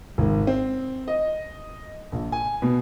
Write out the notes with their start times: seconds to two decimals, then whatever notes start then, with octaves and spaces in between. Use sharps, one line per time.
0.18 G#1
0.47 C4
1.08 D#5
2.12 A#1
2.32 G#5
2.62 B2